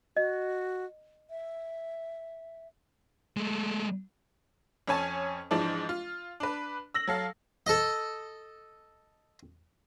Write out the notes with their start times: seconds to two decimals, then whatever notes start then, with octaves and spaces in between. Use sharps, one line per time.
0.17 F#4 D#5
1.30 E5
3.37 G#3 A3
4.88 F2 C#4 C#5 G#5 A5
5.51 G#2 E3 F3 G#3 D4
5.89 F4
6.40 D4 B4
6.94 E6 A#6 F#7
7.07 F#3 A4 F5
7.67 A4 D#5